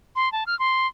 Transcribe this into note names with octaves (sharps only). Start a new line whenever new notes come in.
C6
A5
F6
C6